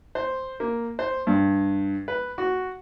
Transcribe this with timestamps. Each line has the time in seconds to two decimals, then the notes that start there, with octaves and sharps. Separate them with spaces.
0.15 C5
0.60 A#3
0.99 C5
1.27 G2
2.08 B4
2.38 F#4